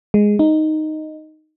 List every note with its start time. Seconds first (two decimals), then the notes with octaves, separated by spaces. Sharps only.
0.14 G#3
0.39 D#4